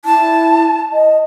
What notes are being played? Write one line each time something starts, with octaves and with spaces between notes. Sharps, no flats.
E4 A5
D#5